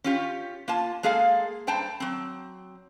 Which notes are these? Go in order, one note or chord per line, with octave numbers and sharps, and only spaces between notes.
C#4 F4 G4
A#3 F4 A5
G#3 A#3 G#4 A4 F5
G2 C5 G5 A5 A#5
F#3 C4